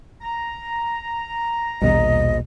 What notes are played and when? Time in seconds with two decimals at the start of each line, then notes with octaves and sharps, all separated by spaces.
0.21 A#5
1.82 A#1 D#2 B2 G3 D#5